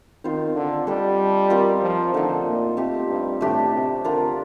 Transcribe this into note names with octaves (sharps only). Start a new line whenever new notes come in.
D#3 C4 F4 C5
D3
G3 D4 A4 D#5
C4 F4 A#4
F3
D3 A3 D#4 A4 D#5
A#2
A3 C4 G4
G2
A2 A3 D4 G4
C3
D3 D4 F4 A#4